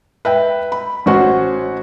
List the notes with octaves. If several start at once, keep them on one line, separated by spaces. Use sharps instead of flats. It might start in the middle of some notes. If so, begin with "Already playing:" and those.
B4 E5 G5
B5
A1 C#4 F#4 C5 F#5